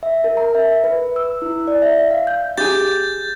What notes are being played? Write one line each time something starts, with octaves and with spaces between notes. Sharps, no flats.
E5
A#4
A#5
E5
B4
E6
E4
D5
E5
F5
G6
G4 G#4 G6 A6